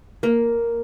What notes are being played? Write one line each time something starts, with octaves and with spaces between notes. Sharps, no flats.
A#3